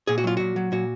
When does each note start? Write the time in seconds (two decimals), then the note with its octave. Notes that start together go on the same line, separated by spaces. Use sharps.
0.07 A#2 G#4
0.18 F#4
0.24 F#3 F4
0.37 A#2 F#4
0.56 F#3
0.72 A#2 F#4